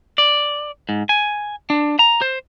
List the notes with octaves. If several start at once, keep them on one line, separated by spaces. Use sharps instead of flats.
D5
G#2
G#5
D4
A#5
C5